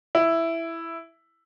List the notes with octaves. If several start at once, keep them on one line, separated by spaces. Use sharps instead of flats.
E4